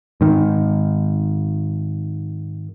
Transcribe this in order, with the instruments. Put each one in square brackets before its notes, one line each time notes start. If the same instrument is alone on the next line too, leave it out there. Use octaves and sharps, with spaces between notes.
[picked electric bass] G#2 D#3